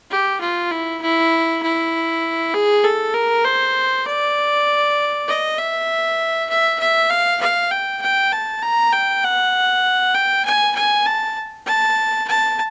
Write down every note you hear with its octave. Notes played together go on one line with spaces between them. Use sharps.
G4
F4
E4
E4
E4
G#4
A4
A#4
C5
D5
D#5
E5
E5
E5
F5
F5
G5
G5
A5
A#5
G5
F#5
G5
G#5
G#5
A5
A5
A5